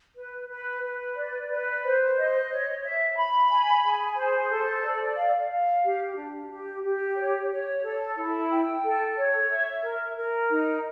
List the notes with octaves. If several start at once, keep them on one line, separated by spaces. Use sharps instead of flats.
B4
B4
B4
D5
B4
C5
D#5
C#5
E5
B5
G#5
G#4
C5
A4
D5
F5
F5
G4
D4
G4
G4
C#5
C#5
A4
E4
G5
A4
C#5
E5
A#4
A#4
D#4